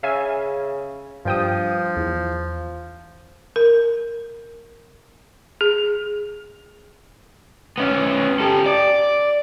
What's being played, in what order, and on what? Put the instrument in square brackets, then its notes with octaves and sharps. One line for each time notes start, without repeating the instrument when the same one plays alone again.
[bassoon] C#3 [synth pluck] E5 F5 G#5
[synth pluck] G2 G5 D#6 [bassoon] F3
[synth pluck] E2
[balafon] A#4
G#4
[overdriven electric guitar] B3 C#4
G4 A4
D5